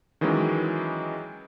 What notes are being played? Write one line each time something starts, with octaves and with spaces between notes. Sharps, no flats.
D#3 E3 F#3 G#3 C#4 E4